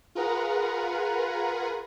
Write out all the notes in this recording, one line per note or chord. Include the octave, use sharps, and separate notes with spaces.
F4 G#4 A#4 B4 F#5 A#5